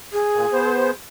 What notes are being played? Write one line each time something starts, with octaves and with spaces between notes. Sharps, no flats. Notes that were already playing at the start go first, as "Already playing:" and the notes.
G#4
A#2
B3 C5